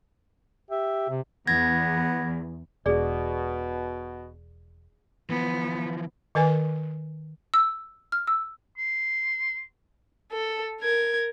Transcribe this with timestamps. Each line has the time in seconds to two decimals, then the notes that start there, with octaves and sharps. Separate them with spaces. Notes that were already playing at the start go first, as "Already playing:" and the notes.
0.71 G4 E5
1.09 C3
1.47 E2 B3 G#6 A#6
2.86 E1 B2 G#4 D5
5.30 E3 F3 B3
6.35 D#3 A#4 B4 G#5
7.54 E6
8.12 F6
8.27 E6
8.78 C6
10.32 A4
10.81 A#4 G#6